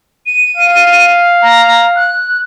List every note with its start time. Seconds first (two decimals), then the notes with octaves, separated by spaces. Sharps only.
0.26 D#7
0.57 F5
1.42 A#5
1.96 F#6